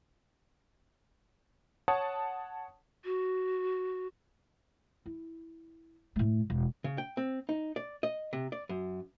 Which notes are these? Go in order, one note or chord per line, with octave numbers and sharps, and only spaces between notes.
C#5 F#5 A5 D#6
F#4
E4
A2 A3
E1
C#3
G5
C4
D#4
D5
D#5
C3
D5
F#2